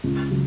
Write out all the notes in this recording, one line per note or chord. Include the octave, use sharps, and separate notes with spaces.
C#2
C#3 F#3